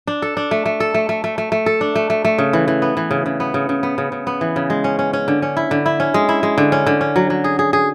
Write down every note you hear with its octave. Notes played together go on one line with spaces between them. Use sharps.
D4
A4
D4
A3
A3
A4
A3
A3
A3
A3
A3
A4
D4
A3
A3
A3
C#3
E3
E3
B3
E3
C#3
C#3
B3
C#3
C#3
B3
C#3
C#3
B3
E3
C#3
G#3
C#4
C#4
C#4
D3
C#4
E4
D3
E4
C#4
G#3
E4
G#3
D3
C#4
D3
C#4
F#3
F#3
G#4
G#4
G#4